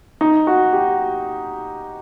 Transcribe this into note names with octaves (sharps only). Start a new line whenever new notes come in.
D#4
F#4
G4